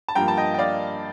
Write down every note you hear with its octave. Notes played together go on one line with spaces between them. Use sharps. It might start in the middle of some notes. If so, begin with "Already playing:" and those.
A5
G2 F3 A#3 G5 A#5
A5
D#5 G5
G5
D5 F5